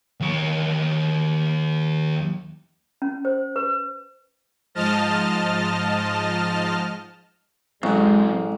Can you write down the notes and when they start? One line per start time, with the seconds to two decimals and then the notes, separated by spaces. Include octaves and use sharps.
0.20 D#2 C#5
3.02 C#4
3.25 C5
3.56 B4
4.75 G#2 F3 D#5 A5 F6
7.83 A1 F#3 G#3 C4